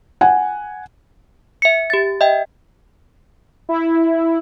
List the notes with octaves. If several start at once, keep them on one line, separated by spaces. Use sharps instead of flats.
F#5 G#5
E5 C#7
G4 A6
D#5 E5 G5
E4